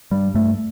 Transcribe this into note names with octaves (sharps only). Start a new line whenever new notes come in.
G2 G3
G2 A3